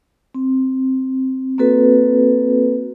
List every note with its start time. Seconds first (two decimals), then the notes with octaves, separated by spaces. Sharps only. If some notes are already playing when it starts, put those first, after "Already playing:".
0.34 C4
1.58 A#3 C4 F#4 A4 B4